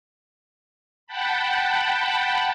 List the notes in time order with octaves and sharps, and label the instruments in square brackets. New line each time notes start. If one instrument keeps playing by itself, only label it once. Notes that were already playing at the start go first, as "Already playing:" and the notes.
[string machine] F#5 G5 A5 B5